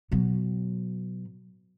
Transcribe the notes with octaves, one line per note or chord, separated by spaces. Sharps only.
B2 F#3